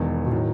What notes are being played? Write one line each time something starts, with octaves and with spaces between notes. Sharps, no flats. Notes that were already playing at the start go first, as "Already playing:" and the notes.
Already playing: E1 E2 D#3
B2
A2 D#3 F#3